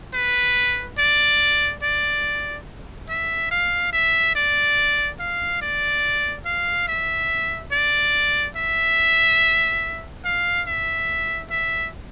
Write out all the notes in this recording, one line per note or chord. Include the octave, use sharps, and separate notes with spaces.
B4
D5
D5
E5
F5
E5
D5
F5
D5
F5
E5
D5
E5
F5
E5
E5